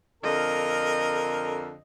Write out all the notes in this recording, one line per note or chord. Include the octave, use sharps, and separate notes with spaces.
F2 D3 A#4 D#5